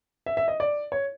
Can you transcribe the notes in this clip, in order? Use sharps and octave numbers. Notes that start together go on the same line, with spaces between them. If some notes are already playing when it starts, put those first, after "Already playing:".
E5
E5
D#5
D5
C#5